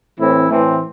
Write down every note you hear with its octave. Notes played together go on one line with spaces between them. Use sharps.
A2 E3 C4 E4
A2 E3 A3 C4